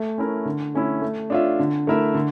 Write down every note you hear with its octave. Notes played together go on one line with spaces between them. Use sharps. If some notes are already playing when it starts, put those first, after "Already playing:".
Already playing: A3
C#4 E4 A#4
D3
A3 C#4 E4
A3
D4 F4 C#5 E5
D3
A3 E4 A#4 E5
D3